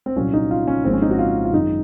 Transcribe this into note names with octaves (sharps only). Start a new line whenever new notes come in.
C4
C2 A#2 F#3 A#3 C#4
D#4
F4
C#4
G#1 G#2 F3 A#3 C4
C#4
D#4
F#4
F4
F4
F#2 D#3 G#3 D#4